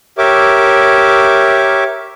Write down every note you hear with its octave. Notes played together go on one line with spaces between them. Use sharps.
G4 A#4 C#5 E5 D6